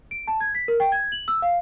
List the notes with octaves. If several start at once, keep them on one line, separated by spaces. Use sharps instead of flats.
D7
A5
G#6
B6
A#4
G5
G#6
F#7
E6
F5